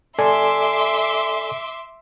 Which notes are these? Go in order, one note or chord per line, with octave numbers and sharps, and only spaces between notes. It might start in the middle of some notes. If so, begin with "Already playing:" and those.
A4 D5 E5 G#5 C6 D6